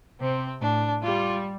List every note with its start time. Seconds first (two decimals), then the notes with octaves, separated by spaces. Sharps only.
0.21 C3 C4
0.61 A2 D4
1.02 G3 F4